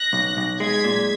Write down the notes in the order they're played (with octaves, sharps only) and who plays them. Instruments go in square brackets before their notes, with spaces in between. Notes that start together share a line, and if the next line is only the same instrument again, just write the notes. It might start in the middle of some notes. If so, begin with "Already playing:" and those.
Already playing: [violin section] F#6 A#6
[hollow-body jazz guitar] B1
B1
[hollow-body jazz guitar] G#3 [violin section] G#6 B6
[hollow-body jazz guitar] A#2